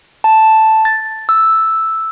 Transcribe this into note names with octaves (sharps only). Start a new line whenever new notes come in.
A5
A6
E6